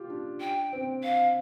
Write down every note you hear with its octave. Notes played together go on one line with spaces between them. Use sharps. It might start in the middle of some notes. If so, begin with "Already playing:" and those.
Already playing: F4 G4
D4
G5
C4
F5